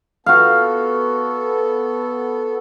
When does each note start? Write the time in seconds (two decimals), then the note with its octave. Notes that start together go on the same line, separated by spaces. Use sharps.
0.26 B3 F#4 A4 F5